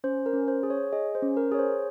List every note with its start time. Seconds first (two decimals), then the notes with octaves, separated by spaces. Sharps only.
0.04 C#4 C5
0.26 A#4
0.33 C#4
0.48 C5
0.63 G#4
0.70 C#5
0.92 G#4 D#5
1.15 C5
1.22 C#4
1.37 A#4
1.52 G#4 C#5
1.59 C5